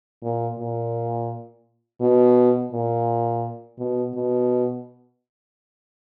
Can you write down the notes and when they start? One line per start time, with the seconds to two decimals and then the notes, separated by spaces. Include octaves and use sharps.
0.22 A#2
0.58 A#2
2.01 B2
2.72 A#2
3.78 B2
4.15 B2